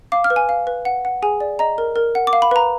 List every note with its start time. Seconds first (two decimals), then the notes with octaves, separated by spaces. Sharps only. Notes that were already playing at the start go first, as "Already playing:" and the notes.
0.12 F5 D6
0.24 F6
0.30 B4
0.36 G#5
0.49 F5
0.67 B4
0.85 F#5
1.05 F#5
1.22 G#4 G#5
1.40 D5
1.59 D#5 A#5
1.78 A#4
1.96 A#4
2.15 F#5
2.27 D6
2.33 F5
2.42 B5
2.51 B4 A#5